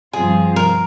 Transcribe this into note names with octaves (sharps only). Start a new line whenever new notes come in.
G2 F3 C4 F4 G#4
A#4